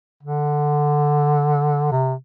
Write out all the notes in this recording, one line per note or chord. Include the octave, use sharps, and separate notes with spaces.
D3
C3